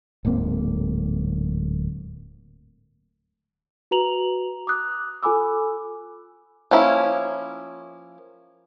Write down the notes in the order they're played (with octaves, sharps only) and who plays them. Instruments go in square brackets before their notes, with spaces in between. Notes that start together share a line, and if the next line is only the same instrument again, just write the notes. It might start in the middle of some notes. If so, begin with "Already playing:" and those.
[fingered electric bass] D1 G#2 A#3 C4
[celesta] F#4 B4 A#5 F7 F#7
D6 D#6 F#6
F4 A4 G#5 B5 D6 E6
[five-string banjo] F3 A#3 C#4 E4